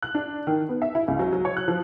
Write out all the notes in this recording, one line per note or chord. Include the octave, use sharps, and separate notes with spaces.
F#6
D4
D#3
B3
E5
E4
C#2
F#3
F#3
C#5
F#6
F3